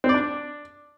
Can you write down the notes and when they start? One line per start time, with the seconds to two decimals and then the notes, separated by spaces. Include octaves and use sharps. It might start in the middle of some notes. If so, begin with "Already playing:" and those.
0.04 C4
0.09 D5
0.14 D4